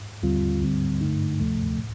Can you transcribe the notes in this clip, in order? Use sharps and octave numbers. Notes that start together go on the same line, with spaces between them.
D#2 D3 G3 C4 F4
D2 D3 G3 C4
G2 D3 A3 D#4
D2 C3 F3 A3
A2